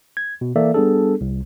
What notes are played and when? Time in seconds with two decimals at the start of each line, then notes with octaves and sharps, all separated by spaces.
0.17 G#6
0.41 B2
0.56 E3 A#3 A4 D5 E5
0.74 G3 B3 D4 G#4 A4
1.21 C2